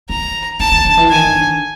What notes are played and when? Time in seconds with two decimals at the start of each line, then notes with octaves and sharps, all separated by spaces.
0.09 D#3 A#5
0.60 D#3 A5
0.72 D#3
0.85 D3
0.97 E3
1.10 D#3 G#5
1.25 D#3
1.35 D3